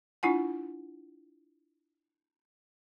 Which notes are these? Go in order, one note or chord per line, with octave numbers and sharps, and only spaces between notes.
D4 E4 F4 F#5 G#5